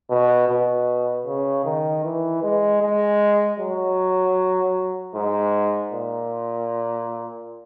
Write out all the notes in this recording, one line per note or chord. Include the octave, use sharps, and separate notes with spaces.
B2
B2
C#3
D#3
E3
G#3
G#3
F#3
G#2
A#2